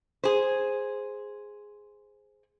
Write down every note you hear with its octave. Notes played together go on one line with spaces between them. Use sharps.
G#4 C5